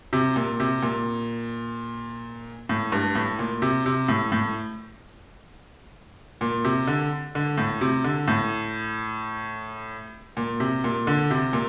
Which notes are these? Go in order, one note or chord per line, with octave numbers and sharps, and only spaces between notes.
C3
A#2
C3
A#2
A2
G2
A2
A#2
C3
C3
A2
A2
A#2
C3
D3
D3
A2
C3
D3
A2
A#2
C3
A#2
D3
C3
A#2